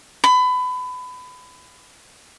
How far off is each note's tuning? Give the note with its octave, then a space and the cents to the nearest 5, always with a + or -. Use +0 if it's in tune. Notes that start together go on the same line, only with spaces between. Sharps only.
B5 +25